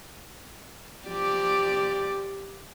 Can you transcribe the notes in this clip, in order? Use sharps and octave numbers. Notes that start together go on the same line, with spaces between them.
F3 G4 D5